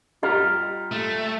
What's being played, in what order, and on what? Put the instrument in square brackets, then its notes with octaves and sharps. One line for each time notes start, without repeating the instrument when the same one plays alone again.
[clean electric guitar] G3 F4 A#5 [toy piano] G4 D#5
[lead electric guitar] A3